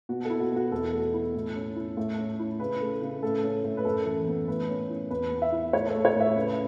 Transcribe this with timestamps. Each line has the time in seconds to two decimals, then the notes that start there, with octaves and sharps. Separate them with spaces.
0.09 B2 F#4
0.25 A4
0.30 E4
0.40 F#4
0.51 B2 F#4
0.72 E2 A4
0.93 A3
1.14 E4
1.34 A2
1.55 C#4
1.76 E4
1.97 A2
2.18 C#4
2.39 E4
2.60 C#3 B4
2.81 A3
3.02 C#3
3.23 A2 A4
3.43 C#4
3.64 A2
3.77 B4
3.85 F#2 A4
4.06 E3
4.27 B3
4.48 A2 B4
4.69 C#4
4.90 E4
5.10 E2 B4
5.31 B3
5.42 E5
5.52 E4
5.73 A2 C#5
5.89 A4
5.94 A3
6.05 C#5
6.15 A2 E5
6.36 C#3 B4